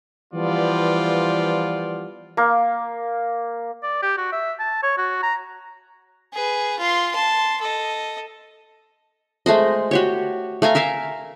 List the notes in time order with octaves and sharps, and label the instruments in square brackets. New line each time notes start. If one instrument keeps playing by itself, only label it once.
[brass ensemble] E3 F3 G3 B3 F4 D5
[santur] A#3
[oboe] D5
G4
F#4
E5
A5
C#5
F#4
A#5
[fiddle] G#4 B4
F4 C6
A5 C6
A4 D#5
[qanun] G#3 A3 C5 D#5
F#4 G4 C#5
A3 F5 G#5 A#5
A#4 E5 F5 G#5